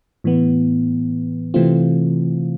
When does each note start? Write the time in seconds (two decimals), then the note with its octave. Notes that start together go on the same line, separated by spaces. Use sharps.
0.24 A2 E3 B3
1.54 C3 E3 A3 C4 F4